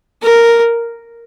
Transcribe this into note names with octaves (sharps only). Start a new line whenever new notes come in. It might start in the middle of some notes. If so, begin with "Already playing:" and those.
A#4